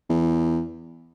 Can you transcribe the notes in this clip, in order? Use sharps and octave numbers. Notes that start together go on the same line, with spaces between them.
E2